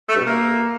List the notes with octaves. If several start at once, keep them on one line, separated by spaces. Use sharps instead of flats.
A3
G2
B2
A#3